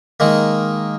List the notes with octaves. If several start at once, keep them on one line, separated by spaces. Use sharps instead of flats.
D#3 G#3 A#3